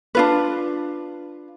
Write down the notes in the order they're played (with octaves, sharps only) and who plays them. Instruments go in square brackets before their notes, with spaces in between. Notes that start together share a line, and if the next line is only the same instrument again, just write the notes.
[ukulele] D4 F4 B4